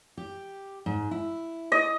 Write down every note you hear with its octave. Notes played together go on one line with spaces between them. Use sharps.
G4
G#2
E4
D#5